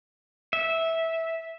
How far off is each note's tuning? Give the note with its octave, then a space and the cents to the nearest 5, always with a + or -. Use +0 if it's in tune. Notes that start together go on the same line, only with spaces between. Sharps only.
E5 -10